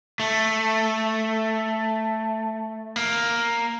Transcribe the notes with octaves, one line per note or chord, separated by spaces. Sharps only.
A3
A#3